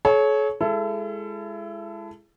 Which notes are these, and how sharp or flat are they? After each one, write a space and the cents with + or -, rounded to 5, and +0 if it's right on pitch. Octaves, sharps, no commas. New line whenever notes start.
A4 -45 C#5 +0
G#3 +0 E4 +35 A4 +0